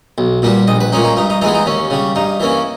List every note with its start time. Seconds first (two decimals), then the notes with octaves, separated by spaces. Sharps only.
0.18 B1
0.42 A#2 G3 B3
0.67 A#1 D#5
0.80 B4
0.92 A#2 G#3 C#4 D#4
1.04 D#4
1.16 G2 D#4
1.30 D#4
1.41 E3 G#3 B3 D#4
1.54 D#4
1.66 D#2 C#4
1.90 C#3 G3
2.15 G2 D#4
2.40 E3 A#3 C#4